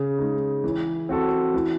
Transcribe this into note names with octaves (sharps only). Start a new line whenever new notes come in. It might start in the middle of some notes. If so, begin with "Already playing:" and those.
Already playing: C#3
G#3 D#4
E3
C4 F#4 A4
E3